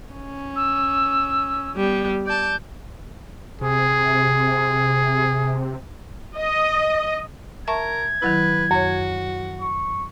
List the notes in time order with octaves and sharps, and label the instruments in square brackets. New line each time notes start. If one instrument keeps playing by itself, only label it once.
[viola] C#4
[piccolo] E6
[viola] G3 B3
[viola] D5 A5 [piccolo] G6
[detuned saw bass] C3 [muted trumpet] G#4
[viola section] D#5
[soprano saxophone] A#4 [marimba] E5 A5 C#6 [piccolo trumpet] G#6
[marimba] D#3 F#3 E4 [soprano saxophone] B4
[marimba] F#2 C#5 [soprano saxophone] F#4
[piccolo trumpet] C#6